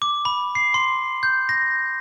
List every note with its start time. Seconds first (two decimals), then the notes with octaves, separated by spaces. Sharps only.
0.02 D6
0.25 B5
0.55 C7
0.74 C6
1.23 G6
1.49 A#6